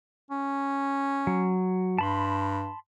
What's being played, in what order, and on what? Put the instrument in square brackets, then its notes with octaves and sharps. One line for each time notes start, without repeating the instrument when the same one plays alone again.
[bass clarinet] C#4
[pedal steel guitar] F#3
[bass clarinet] G2 [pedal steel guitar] A5 B5 C6